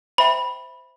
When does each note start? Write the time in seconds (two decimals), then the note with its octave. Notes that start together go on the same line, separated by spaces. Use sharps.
0.18 C5 E5 G5 B5